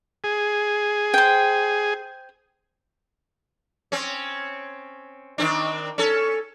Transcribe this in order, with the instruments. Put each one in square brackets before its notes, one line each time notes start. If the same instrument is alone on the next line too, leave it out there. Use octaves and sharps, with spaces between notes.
[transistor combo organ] G#4
[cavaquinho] C5 G5
[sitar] C4 C#4
D#3 C4 D4
C#4 A4